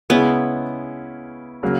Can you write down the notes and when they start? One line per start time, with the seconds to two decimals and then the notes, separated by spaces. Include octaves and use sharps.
0.10 C#3 G#3 B3 C#4 E4
1.63 C#3 F#3 A#3